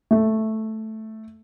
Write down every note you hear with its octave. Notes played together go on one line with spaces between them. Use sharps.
A3